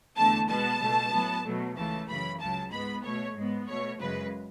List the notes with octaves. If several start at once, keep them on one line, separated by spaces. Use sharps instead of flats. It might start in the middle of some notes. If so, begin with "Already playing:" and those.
E2 D3 A3 A5
B2 G#3 B3 A5
C#2 B2 A3
A2 F#3 B3
B2 F#3 A3
C#2 C#3 E3 A3 A5
F#2 C#3 E3 B5
C#2 C#3 F#3 A5
G#2 G#3 B3 B5
B2 A3 C#5
G#2 G#3 B3
B2 A3 C#5
F#2 C#3 G#3 B4